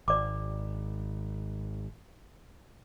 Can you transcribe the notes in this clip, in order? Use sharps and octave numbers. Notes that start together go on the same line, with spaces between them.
G#1 D5 D6